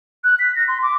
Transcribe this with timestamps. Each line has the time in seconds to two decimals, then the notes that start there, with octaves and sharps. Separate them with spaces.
0.24 F#6
0.39 B6
0.56 A#6
0.68 C6
0.83 D6